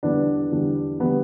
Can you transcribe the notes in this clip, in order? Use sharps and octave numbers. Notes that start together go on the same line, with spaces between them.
E2 D3 G3 B3 D4
E2 D3 G3
D3 G3 B3